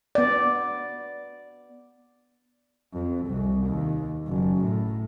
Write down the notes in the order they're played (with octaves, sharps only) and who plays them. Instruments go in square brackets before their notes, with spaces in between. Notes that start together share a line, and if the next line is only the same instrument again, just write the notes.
[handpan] B3 D5
[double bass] F2
C2
D#2
F#1
A2